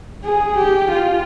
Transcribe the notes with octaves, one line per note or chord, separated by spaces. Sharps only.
G#4
G4
F4